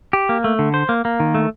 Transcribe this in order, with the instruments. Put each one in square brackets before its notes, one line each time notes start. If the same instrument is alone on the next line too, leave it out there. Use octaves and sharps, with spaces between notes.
[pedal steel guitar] G4
A#3
A3
D3
C5
A#3
A#3
D#3
A3